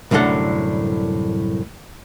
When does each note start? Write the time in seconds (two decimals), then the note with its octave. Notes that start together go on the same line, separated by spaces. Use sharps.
0.11 C2 F#2 A2 D3 A4 F#5